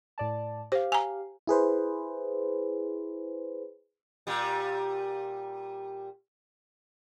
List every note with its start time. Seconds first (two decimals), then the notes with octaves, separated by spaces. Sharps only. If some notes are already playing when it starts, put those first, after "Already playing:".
0.18 A2 D5 A5
0.72 G4 C5 F5
0.92 G#5 A#5
1.47 E4 G#4 B4 C5
4.27 A#2 G3